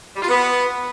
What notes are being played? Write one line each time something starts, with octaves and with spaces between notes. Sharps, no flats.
G3
F4
B3